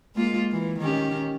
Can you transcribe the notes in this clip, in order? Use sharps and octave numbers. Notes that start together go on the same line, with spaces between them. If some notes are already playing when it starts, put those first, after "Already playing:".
G#3 A#3 F4
E3
D#3 C#4 G4